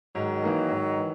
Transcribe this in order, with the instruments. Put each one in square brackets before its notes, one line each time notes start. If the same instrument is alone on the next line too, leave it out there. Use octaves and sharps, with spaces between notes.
[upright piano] G#2 [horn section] D#3 F#3
[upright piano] E3 A#3 D#4 A#4
G#2
E3